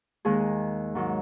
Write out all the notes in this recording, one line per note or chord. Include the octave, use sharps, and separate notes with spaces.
D#2 D#3 G#3 G#4
G#2 D#3 F#3